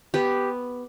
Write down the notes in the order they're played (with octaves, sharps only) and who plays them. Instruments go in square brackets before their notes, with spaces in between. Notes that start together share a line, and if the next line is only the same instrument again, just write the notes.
[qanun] B3 G4